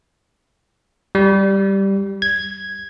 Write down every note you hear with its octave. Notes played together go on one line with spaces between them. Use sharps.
G3
G#6